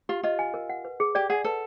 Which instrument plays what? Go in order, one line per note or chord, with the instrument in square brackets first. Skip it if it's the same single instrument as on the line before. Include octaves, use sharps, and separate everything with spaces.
[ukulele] F4 [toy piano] G4
[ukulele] F4 [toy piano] D#5
[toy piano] G#5
A#4
F#5
B4
G#4
[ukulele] G4 [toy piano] D5
[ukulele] G#4 [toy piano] F#5
[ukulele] A4 [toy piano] B4